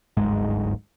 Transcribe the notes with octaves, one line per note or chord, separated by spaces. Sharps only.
D1 G1 G#2 G#3